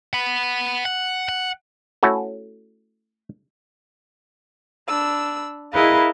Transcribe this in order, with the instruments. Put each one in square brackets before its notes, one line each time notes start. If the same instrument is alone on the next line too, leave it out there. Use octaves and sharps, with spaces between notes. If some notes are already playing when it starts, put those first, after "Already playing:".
[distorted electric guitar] F#5 B5
F#5
F#5
[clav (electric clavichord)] A3 C#4 E4 F#4 A4
[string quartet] D4 B5 E6
E4 G#4 A#4 B4 D#5 F5